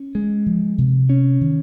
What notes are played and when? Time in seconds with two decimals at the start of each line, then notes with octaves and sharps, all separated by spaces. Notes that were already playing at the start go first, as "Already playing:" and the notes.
Already playing: C#4
0.15 G#3
0.46 F3
0.78 C3
1.09 C#4
1.41 D#3